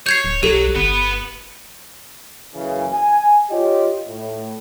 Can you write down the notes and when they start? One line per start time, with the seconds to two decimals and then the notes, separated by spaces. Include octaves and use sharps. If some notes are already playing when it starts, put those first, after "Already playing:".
0.06 C#5 G6 G#6 C7
0.25 D1
0.43 B1 F#3 G4 A4
0.76 G1 B3 B4
2.55 F#1 C#3 E3
2.92 G#5
3.51 F4 G4 C#5 D#5
4.07 A2